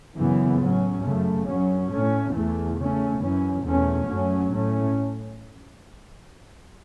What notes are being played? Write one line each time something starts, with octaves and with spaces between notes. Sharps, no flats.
F#2 C#3 E3 B3
A2 F#3 C#4
F#2 C#3 A3
F#2 F#3 C#4
A2 A3 C#4
E2 E3 A3
C#3 A3 C#4
F#2 E3 C#4
E2 B2 A3 C#4
F#2 F#3 A3 C#4
A2 A3 C#4